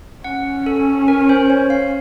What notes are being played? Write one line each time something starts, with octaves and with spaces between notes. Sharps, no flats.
C#4 F#5
A4
A#4
C5
C#5
F5